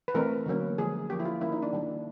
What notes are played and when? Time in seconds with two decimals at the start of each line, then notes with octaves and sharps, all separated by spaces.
0.08 B4
0.14 E3 A3 C4 A#4
0.46 D3 F#3 A#3 C#4
0.78 D3 F3 G#3 G#4
1.10 F3 A#3 C#4 G4
1.20 E4
1.25 F4
1.41 D#3 G3 A#3 C#4 E4
1.52 D#4
1.62 D4
1.73 D#3 G3 A#3